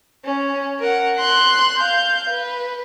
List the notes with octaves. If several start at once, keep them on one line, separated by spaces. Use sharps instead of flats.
C#4
A#4 F#5
C6 F#6
F5 G6
B4